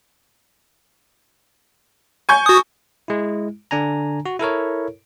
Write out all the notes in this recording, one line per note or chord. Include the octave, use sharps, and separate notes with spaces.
G#5 C#6 G6
F#4 D#6
G#3 E4
D3 D4 G#5 A#5
F#4
E4 A4 A#4 C#5